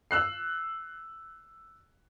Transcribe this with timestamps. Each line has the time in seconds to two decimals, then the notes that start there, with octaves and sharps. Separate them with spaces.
0.11 E6 F#6 C7